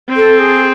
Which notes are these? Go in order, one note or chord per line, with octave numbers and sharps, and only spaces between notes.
C4
A4
G#4